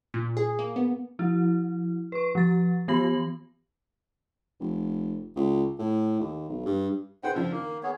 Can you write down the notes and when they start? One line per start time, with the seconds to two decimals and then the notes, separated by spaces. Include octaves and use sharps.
0.14 A#2
0.37 G#4
0.59 A#3
0.76 B3
1.19 F3 E4
2.12 B4 C#6
2.35 F3 A6
2.88 E3 B3 G4 B5 A#6 F#7
4.60 F1
5.36 C#2
5.79 A2
6.20 D#2
6.49 B1
6.66 G2
7.23 D#4 G#4 B4 C5 F#5 G5
7.35 C#3 F3 D4 E6
7.51 D#3 A#3
7.83 B3 G#4 C#5